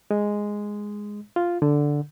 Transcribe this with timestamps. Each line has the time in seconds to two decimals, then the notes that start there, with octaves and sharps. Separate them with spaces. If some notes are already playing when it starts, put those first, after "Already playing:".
0.11 G#3
1.36 F4
1.62 D3